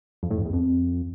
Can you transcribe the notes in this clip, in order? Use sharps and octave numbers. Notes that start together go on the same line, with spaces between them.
F2
A2
F2
E2
F2